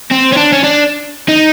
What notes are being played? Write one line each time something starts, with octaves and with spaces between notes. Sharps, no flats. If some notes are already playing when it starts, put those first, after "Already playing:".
C4
C#4
D4
C#4
D4
D#4